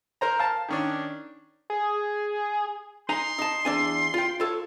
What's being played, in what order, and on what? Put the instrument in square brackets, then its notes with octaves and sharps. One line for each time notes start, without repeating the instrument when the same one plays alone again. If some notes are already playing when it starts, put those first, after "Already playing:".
[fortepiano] A#4 C5 A#5
F5 A5
D#3 C#4 D4
[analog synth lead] G#4
[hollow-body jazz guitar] D#4 G#5 A#5 [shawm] C6
[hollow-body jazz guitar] D#4 A5
E2 D4 G#5
F4 G5
F4 A4 C#5